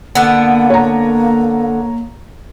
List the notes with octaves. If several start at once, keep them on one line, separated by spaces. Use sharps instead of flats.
D3 A#3 B3
C#5 A#5